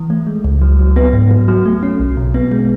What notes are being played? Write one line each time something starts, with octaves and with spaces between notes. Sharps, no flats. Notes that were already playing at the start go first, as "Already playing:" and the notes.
Already playing: E3
A3
G#3
C#2
F#3
F#3
B3
G#2
F#3
F#3
A3
C#4
B1
B2
B3
G#3